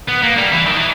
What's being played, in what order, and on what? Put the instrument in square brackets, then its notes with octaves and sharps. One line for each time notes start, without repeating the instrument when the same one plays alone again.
[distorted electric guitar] B3
A#3
G3
E3
D#3
E3